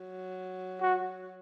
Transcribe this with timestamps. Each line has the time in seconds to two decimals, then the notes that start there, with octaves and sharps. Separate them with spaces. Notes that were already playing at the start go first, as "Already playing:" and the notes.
Already playing: F#3
0.81 F#4